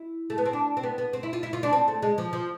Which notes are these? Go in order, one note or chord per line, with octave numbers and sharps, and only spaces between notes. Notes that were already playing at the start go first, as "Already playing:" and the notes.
Already playing: E4
A3
B3
C4
D4
C4
B3
B3
C4
E4
F4
E4
F4
D4
C4
A3
G#3
F3
F3